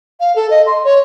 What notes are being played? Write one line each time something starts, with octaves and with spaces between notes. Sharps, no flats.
F5
A4
D#5
C6
C#5